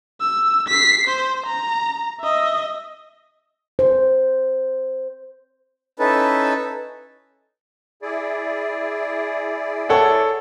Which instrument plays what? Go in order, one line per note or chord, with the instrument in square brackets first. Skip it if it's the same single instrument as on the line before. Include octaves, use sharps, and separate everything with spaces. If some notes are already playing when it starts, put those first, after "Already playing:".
[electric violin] E6
B6 C7
C5
A#5
D#5 E5
[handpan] C5
[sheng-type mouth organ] C#4 D#4 E4 A4 B4
[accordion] E4 G#4 D5
[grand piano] A4 C#5 F#5